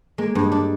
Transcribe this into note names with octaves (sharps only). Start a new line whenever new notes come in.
G#3 A#3
G2
D#4
D4